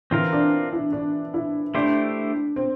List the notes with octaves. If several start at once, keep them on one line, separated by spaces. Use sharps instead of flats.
E3 C4 F4 A#4
D4
E4
D4
E4
A3 D4 E4 G4 C5
C4